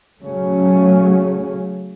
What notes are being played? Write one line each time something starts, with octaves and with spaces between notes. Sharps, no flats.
C#3 F#3 A3 C#4